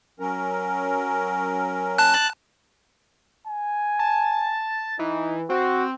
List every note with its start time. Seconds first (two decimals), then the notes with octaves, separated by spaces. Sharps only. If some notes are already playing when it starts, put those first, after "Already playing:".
0.20 F#3 C#4 A#4
1.98 A5 F#6
3.48 G#5
3.99 A5
4.99 E3 D#4
5.50 C4 F#4